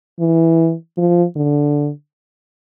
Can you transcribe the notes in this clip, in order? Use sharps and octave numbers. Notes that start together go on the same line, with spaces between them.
E3
F3
D3